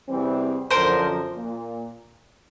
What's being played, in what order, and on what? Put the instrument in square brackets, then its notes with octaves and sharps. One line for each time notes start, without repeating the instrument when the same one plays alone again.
[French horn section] E2 C3 E3 G3 C4
[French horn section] F#2 D3 F3 [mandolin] A#4 C5
[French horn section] A#2